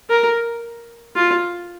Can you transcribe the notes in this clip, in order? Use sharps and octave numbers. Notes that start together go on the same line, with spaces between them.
A#4
F4